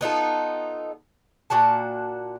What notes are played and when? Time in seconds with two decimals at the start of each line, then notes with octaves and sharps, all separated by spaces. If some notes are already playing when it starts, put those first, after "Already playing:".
0.01 B3 D#4 F4 A4
1.50 A#2 D4 F#4 A5